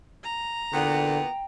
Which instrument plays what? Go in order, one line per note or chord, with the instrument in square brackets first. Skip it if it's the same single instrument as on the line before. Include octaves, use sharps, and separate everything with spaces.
[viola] A#5
[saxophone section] E2 A#2 B3 [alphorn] D3 [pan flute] G5